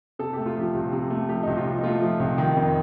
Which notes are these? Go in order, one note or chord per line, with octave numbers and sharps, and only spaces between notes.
C3 A4
A3 G4
F4
F3 G4
C2
C3
A3
F3 G4
C2 D#4
F4
C3
D#4
A3 F4
F3
C2
D#3
F2